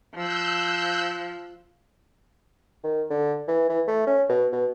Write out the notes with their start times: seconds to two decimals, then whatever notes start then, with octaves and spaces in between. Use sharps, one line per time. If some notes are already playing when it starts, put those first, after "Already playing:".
0.15 F3 E6 F#6 G6
2.84 D#3
3.10 D3
3.48 E3
3.69 E3
3.88 A3
4.07 C#4
4.29 B2
4.53 B2